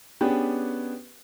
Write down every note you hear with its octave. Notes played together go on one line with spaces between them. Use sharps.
B3 C#4 D4 G4 G#4 B4